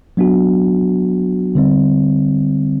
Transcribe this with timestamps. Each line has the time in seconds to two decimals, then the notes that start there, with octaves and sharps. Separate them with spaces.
0.17 F#3 B3 D4 F#4
1.55 D3 G3 C4